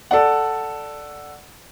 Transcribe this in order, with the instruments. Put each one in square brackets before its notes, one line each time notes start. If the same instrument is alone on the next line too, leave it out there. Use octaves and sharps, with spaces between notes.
[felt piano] A4 D5 F#5